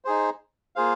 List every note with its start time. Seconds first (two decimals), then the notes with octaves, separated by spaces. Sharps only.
0.05 D#4 G#4 C5
0.76 A#3 F4 G#4 C5 F5